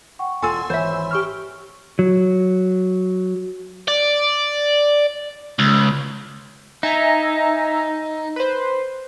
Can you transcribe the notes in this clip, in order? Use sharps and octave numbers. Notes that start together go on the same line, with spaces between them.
F#5 G5 C#6
E1 F4 A4 G#5 C6 E6
G#1 E3 C5 C#5 E5 B5
G4 C#6 F6
F#3
D5
C#2
D#4 E5 G#5 A#5
B4 C5